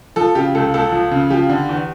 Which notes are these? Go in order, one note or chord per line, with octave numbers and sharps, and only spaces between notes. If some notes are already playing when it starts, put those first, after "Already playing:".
F3 A4
C#3 G4
C#2 A4
C#2 A4
F3
C#3
F3 G4
D3
E2